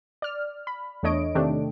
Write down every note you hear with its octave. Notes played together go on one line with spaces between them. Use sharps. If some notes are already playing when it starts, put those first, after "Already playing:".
D5 F6
B5
E2 A3 D4 C#5 D#5 D7
C3 D#3 A3 D4 G4